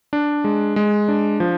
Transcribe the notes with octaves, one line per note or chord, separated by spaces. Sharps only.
D4
G#3
G#3
D4
F3